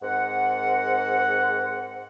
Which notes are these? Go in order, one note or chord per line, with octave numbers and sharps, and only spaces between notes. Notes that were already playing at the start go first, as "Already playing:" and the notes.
G#2 C4 A#4 F#5